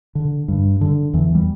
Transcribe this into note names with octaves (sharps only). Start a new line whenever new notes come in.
D3
G2
D3
E2 E3
G3